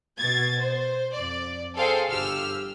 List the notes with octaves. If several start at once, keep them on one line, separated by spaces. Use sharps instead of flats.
B2 G#6 A6
C5
F2 D5
G#4 A4 C5 F5 G5
G1 G4 E6 F6